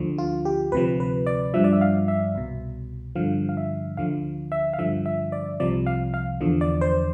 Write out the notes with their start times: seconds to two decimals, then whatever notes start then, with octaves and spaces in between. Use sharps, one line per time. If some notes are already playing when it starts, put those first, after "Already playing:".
Already playing: D2 D3 F3
0.18 F4
0.45 G4
0.72 D2 C3 F3 B4
1.00 B4
1.27 D5
1.54 G2 F3 E5
1.64 D5
1.73 E5
1.81 F5
2.08 E5
2.35 C2 B2
3.16 G2 D3 F3 F5
3.49 F5
3.57 E5
3.97 D2 D3 F3 F5
4.52 E5
4.73 F5
4.79 G2 D3 F3 E5
5.06 E5
5.32 D5
5.60 C2 C3 F3 D5
5.86 F5
6.14 F5
6.41 E2 D3 F3
6.61 D5
6.81 C5